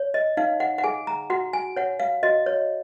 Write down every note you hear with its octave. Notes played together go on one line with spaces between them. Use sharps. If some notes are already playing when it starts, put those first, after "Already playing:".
Already playing: C#5
D#5
D#4 F5
F#5
F#5
G#4 G#5
A#5
F#4 F#5
G#5
C#5 F#5
F5
F#4 D#5
C#5